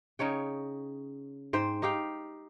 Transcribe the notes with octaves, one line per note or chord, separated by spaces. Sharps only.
C#3 D#4 C#5 G5
G#2 C5 G5
D#4 G4 F5 G5